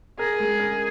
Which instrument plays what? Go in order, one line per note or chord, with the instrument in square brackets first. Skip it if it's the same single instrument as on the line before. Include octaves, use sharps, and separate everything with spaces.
[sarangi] G#4 [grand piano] A#4
[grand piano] G#3
A#4